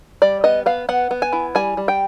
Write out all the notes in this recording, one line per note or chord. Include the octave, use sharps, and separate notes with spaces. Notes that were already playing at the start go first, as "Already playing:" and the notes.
G3 D5
B3 D#5
B3 F5
B3 F#5
B3
G#5
E4
G3 G#5
G3
G5